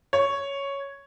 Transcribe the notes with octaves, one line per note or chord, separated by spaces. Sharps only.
C#5